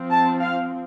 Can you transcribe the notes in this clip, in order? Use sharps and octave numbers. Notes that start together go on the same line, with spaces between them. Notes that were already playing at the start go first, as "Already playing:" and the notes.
Already playing: F3 C4
A5
F5